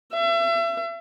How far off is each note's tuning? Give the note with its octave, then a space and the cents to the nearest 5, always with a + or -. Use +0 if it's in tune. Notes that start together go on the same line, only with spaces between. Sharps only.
E5 +35